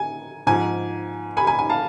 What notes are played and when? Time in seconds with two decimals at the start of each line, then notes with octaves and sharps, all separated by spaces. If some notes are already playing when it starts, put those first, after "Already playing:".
Already playing: G#5
0.47 G#2 F3 G#5
1.37 G#5 B5
1.47 G#5 B5
1.59 G#5
1.70 F5 A5